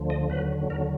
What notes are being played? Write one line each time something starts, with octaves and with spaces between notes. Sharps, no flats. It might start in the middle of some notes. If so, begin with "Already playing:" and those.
Already playing: D2 D3 F3
D#5
D#2 D3 F#3 B4
D#2 D3 F#3 A#4